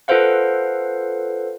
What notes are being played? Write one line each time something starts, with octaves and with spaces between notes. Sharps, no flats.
F4 A4 B4 C5 F5 F#5